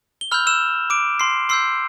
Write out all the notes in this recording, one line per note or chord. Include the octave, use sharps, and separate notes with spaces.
G7
B5 E6 F6 G6 F7
E6 E7
D6 D7
C6 C7
C6 E6 G6 C7